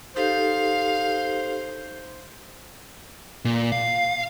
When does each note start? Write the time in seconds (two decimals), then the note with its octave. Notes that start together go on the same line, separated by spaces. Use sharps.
0.16 D#4 G4 A4 C5 F5
3.45 A#2
3.72 F5